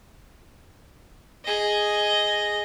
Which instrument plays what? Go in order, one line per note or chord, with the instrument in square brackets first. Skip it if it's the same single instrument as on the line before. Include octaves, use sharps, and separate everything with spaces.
[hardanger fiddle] G#4 D#5